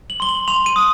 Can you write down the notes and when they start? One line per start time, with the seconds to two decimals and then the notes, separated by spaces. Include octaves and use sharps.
0.10 F#7
0.20 C6 G7
0.29 F#7
0.48 C6 F7
0.66 D#7
0.76 D#6